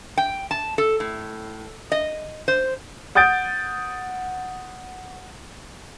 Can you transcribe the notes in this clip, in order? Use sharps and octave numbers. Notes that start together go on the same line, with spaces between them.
G5
A5
A4
A2
D#5
C5
F#5 D#6 G6 A6 D7